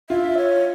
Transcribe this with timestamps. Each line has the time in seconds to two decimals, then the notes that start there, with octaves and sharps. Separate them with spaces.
0.10 F4 E5
0.38 C#5